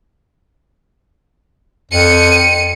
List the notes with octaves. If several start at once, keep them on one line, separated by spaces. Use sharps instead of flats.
F2 C#7 D#7